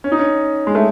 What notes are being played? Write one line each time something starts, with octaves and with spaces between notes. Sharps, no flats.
C#4
D#4
C#4
G#3
A3